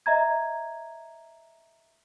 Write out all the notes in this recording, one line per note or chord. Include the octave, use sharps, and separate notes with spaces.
D#5 E5 A#5 G#6